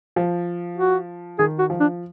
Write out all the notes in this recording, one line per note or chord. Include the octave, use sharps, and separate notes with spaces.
F3
F#4
D#3 G#4
F#4
F3
D4